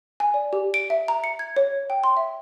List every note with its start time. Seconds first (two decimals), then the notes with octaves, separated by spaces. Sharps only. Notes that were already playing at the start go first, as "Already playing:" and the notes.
0.20 G#5
0.34 D5
0.53 G4
0.74 D7
0.90 E5
1.08 A#5
1.24 C#7
1.39 G#6
1.56 C#5
1.90 G5
2.04 C6
2.17 E5